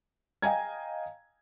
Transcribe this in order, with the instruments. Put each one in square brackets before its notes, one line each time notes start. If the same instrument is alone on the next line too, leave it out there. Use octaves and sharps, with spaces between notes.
[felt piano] D#5 F5 G5 G#5 A#5 G#6